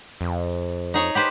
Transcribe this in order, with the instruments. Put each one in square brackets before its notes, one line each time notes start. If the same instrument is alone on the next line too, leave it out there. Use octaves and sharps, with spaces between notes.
[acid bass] F2
[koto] D#4 G#4 C#5
G4 B4 C5